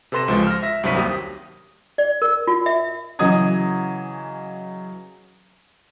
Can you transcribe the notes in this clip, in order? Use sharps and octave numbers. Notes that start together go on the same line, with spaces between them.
C3 A4 B4 C6 A#6 E7
C#2 F3 G#3
F6 A#6
E5 A#6
C2 G2 F#3 C5 B6 D#7
D#2 G4 D#6
D5
A#4
F4
E5
C#3 E3 F#3 D#5 D#6 G#6